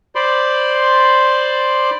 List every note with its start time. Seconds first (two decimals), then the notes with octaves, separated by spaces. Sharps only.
0.15 C5 D5 B5 C6 D6